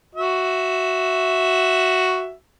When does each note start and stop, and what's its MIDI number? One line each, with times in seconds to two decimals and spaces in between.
0.15 2.33 66
0.15 2.33 76